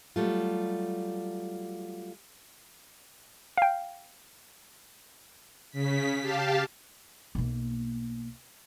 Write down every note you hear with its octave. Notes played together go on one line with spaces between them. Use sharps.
F#3 G3 A3 F4
F5 G5
C#3 B6
G4 F5 A5
B1 A#3